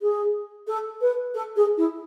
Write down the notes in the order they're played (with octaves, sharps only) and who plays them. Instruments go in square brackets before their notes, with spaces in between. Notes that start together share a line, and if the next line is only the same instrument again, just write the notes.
[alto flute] G#4
A4
B4
A4
G#4
E4